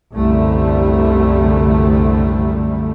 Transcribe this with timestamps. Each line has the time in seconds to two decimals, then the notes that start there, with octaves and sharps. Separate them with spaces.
0.15 C2 F#2 D3 G3 A3